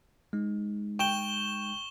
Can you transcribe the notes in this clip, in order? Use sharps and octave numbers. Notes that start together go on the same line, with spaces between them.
G#3 D#4
G5 C#6 E7 G7